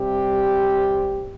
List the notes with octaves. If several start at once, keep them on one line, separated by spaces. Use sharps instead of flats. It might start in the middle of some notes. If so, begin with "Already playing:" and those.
Already playing: C3 G3 C4 G4